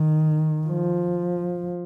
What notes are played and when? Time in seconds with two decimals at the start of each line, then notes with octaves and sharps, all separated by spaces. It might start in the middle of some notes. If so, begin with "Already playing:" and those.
Already playing: D#3
0.67 F3